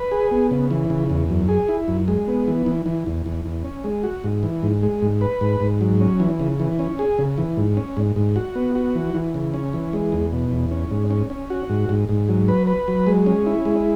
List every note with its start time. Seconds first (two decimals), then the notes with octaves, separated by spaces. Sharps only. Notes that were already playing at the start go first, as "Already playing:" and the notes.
Already playing: B4
0.11 G#4
0.31 B3
0.51 C#3
0.71 E3
0.90 C#3
1.10 E2
1.30 F#2
1.49 G#4
1.68 E4
1.88 F#2
2.08 G#3
2.28 B3
2.48 E3
2.66 E3
2.86 E3
3.06 E2
3.26 E2
3.45 E2
3.64 C#4
3.84 G#3
4.03 F#4
4.24 G#2
4.43 E3
4.63 G#2
4.83 G#3
5.02 G#2
5.21 B4
5.41 G#2
5.60 G#2
5.81 F#3
6.01 C#4
6.20 E3
6.40 C#3
6.60 E3
6.79 C#4
6.99 G#4
7.18 C#3
7.38 E3
7.57 G#2
7.77 C#4
7.97 G#2
8.16 G#2
8.36 F#4
8.55 B3
8.75 F#4
8.95 E3
9.15 E3
9.34 C#3
9.54 C#4
9.73 E3
9.93 G#3
10.12 E2
10.33 B2
10.52 E2
10.71 C#4
10.91 G#2
11.10 C#4
11.30 C#4
11.50 F#4
11.69 G#2
11.89 G#2
12.09 G#2
12.29 F#3
12.48 B4
12.67 B4
12.88 F#3
13.06 G#3
13.26 C#4
13.46 E4
13.65 G#3